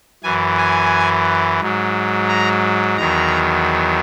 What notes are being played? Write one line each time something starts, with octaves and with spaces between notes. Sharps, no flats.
F#2 E3 G#5
G#5
G#2 F#3
A#5
E2 D#3 F#3 A#5